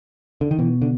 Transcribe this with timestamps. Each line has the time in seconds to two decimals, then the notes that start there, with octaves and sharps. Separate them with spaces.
0.41 D3
0.51 D#3
0.59 B2 E3
0.82 D3